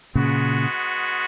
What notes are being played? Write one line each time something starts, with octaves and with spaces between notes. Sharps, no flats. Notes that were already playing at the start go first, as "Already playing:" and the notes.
A#2 C#3 G#3 B3 F#4